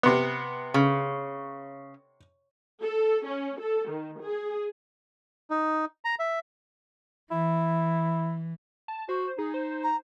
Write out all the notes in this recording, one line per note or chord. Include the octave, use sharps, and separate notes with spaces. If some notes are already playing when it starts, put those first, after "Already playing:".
C3 B3
C#3
A4
C#4
A4
D#3
G#4
D#4
A#5
E5
E3 E4
A5
F#4 C5
D#4 G#4
C5
A#5